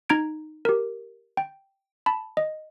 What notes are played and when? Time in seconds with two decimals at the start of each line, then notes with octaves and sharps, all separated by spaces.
0.09 D#4 A#5 G#6 D7
0.65 G4 A#4
1.37 G5
2.06 A5 B5
2.37 D#5